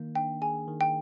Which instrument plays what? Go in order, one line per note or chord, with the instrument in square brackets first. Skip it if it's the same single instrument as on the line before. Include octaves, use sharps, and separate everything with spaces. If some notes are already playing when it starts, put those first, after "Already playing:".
Already playing: [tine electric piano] D#3 A#3
[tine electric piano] D4 [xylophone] G5
[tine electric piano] G#4 [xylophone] G#5
[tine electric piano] D#3
[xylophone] G5